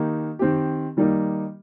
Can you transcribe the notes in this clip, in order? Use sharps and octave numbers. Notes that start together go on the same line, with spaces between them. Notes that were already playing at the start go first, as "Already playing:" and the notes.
Already playing: D#3 A#3 D#4 G4
D#3 C4 G4
D#3 G3 A#3 D#4